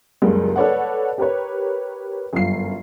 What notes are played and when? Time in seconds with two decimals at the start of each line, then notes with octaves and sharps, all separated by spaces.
0.22 F#1 C#2 G3 A#3
0.56 A4 B4 C#5 D5 F#5
1.18 G4 A#4 B4 C#5
2.33 G1 F#2 F4 C7